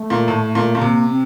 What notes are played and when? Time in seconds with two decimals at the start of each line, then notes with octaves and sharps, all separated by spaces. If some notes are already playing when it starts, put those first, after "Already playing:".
Already playing: A3
0.10 A#2
0.28 A2
0.55 A#2
0.75 A#2
0.81 C3 A#3
1.09 C4